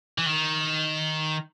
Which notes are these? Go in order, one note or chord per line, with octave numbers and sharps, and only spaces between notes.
E3
D#3